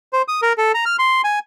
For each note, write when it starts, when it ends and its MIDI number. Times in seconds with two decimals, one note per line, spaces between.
0.13 0.22 72
0.28 0.41 87
0.42 0.53 70
0.58 0.72 69
0.74 0.85 82
0.86 0.96 89
0.99 1.22 84
1.24 1.39 80